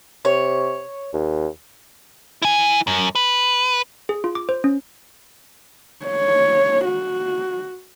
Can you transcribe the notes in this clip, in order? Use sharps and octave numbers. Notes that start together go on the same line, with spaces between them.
C3 C#5
D#2
E4 G#5
F#2
B4
G#4
F4
D6
C5
C#4
C#5
F#4